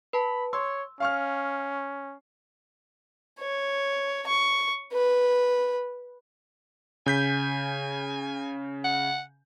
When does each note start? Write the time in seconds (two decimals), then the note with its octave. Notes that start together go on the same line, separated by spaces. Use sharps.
0.13 B4 A5 B5
0.53 C#5 C6 E6
1.00 C#4 F5 C#6 F6
3.40 C#5
4.28 C#6
4.93 B4
7.06 C#3 G#5 G6 B6
8.85 F#5